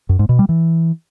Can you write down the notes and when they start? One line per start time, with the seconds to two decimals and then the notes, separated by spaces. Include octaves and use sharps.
0.09 F#2
0.19 G#2
0.29 B2
0.39 G3
0.49 E3